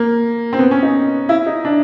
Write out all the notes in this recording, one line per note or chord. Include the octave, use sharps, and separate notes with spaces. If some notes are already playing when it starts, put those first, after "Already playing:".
Already playing: A#3
C4
B3
C#4
D#4
E4
D#4
D4